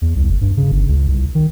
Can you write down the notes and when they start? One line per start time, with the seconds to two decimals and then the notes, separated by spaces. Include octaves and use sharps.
0.02 E2
0.16 C2
0.30 F#1
0.41 G2
0.57 C#3
0.72 G1
0.89 C#2
1.09 C2
1.35 D#3